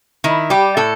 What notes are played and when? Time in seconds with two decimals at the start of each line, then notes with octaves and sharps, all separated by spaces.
0.24 D#3 E4
0.50 G3 G4
0.77 A2 A4